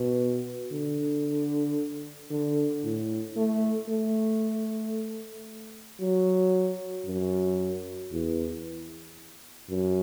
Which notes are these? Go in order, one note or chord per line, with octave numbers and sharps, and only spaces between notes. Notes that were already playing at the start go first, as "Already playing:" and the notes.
Already playing: B2
D3
D3
A2
A3
A3
F#3
F#2
E2
F#2